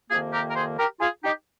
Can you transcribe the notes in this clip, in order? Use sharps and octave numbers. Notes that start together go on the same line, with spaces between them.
F2 C3 D#3 A#3 F4 G#4
G4 A#4
A#4
G#4 C5
G4 A#4
F4 G#4
D#4 G4